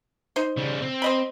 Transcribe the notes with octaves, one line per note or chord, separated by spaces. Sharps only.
D#4 C5
C#3 G3
C4
C5 D#5 B5